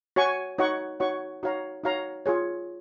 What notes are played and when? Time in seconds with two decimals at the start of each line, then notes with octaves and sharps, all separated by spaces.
0.16 F#4 C#5 G#5 C#6
0.58 D#4 F#4 C#5 F#5 C#6
1.00 D#4 F#4 C#5 F#5 C#6
1.43 D#4 F#4 C#5 F5 A#5
1.84 D#4 F#4 C#5 F5 A#5
2.26 F4 G#4 C#5